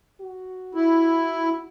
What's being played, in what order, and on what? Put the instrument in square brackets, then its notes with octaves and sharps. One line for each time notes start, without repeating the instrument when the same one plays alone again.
[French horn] F#4
[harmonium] E4